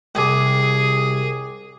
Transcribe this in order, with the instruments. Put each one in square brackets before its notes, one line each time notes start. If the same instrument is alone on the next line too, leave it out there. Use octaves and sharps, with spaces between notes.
[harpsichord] C2 [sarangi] G#4 [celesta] G5 D6